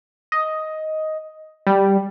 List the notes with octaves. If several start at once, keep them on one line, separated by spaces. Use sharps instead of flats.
D#5
G3